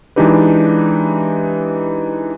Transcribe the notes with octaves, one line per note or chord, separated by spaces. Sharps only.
E3 G#3 D4 D#4 G4 B4